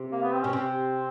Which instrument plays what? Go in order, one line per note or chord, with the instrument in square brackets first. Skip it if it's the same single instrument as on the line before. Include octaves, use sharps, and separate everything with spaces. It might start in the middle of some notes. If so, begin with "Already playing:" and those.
Already playing: [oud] C3
[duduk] A#3
B3
C4
[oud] B2 [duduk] C#4
[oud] C3 [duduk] C4